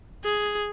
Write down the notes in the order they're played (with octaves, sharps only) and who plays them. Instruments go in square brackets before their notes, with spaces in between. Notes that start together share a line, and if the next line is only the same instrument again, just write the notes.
[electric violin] G#4